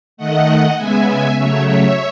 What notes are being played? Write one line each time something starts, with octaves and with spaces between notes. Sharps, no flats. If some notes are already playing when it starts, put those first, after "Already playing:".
D#3 A3 D#5 F#5
C#3 G#3 B3 E5 G#5
E5 G#5
C#3 F#3 A3 C#5 E5
C#5 E5